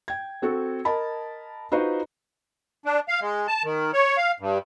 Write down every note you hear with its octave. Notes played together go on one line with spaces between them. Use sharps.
G5 G#6
C4 F#4 A4
A#4 D#5 A5 B5
D#4 F4 F#4 B4 C5
D4
F5
G#3
A5
D#3
C#5
F5
G2